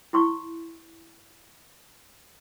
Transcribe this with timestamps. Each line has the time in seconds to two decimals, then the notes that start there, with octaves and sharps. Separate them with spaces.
0.13 E4 C6 C#6